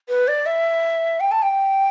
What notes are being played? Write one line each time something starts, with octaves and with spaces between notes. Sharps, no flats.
B4
D5
E5
G5
A5
G5